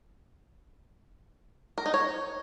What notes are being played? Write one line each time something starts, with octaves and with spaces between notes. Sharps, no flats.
A#4
D#4
C#5